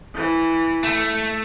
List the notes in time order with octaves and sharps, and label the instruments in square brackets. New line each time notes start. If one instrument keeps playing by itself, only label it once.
[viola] E3
[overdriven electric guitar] A3